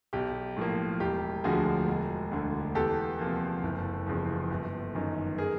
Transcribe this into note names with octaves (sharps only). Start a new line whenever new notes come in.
B1 G4
A2 F3 A#3
E1 G4
D2 D3 F3 F#4 G#4
E1
D2 D3
E2 G4 A4
C3 F3 A#3
F#1
E2 C#3 F3
G1
F#2 D#3
G#4 A#4